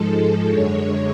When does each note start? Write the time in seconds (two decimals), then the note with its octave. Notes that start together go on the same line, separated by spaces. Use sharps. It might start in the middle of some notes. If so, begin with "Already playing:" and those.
Already playing: G#2 F3 G#3 A4
0.45 F#2 D3 G#3 C#5